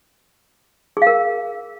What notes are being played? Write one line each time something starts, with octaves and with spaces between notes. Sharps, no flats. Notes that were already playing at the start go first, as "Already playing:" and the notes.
G#4 A#4 F5